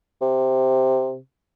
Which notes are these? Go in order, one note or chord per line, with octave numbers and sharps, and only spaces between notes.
C3